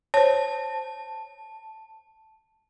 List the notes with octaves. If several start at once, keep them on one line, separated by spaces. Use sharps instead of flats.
C5 C#5 A5